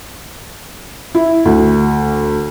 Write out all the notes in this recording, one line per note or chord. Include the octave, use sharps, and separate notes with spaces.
E4
D2